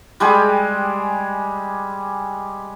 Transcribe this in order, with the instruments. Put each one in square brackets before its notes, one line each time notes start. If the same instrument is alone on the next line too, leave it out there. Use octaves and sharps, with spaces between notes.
[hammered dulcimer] G3 G#3 G4 G#4